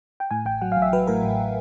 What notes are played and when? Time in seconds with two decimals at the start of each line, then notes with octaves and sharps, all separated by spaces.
0.20 G5
0.31 A2 G#5
0.46 A1 G5
0.62 F#3 F#5
0.72 F5
0.77 A1
0.82 E5
0.93 F#3 B4
1.07 A2 A#4
1.23 A1